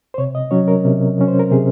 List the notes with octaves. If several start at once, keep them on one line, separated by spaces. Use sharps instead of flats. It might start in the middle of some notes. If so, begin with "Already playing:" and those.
C5
C3 C#5
D#5
F#3 C#4 C#5
A#4
C3
F#3 C#4
C5
A#4
C3 G#4